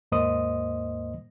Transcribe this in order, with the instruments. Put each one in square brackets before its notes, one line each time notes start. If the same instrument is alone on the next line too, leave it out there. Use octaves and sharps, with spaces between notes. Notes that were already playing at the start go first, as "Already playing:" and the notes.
[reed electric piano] D#2 G#2 A#3 C5 D#5 D#6